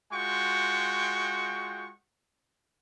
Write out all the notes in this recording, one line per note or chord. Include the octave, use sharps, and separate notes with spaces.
G#3 F4 F#4 G5 C#6